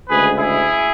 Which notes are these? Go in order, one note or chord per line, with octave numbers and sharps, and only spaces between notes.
D2 C#3 G#3 G#4 B4
E4 G#4